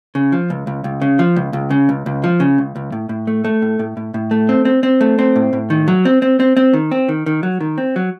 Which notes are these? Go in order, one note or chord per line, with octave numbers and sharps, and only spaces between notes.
C#3
F3
C#2
C#2
C#2
C#3
F3
C#2
C#2
C#3
C#2
C#2
F3
C#3
C#2
C#2
A2
A2
A3
A3
A2
A2
A2
A2
A3
C4
C4
C4
A3
C4
A2
A2
D#3
F#3
C4
C4
C4
C4
D#3
C4
D#3
D#3
F#3
D#3
C4
F#3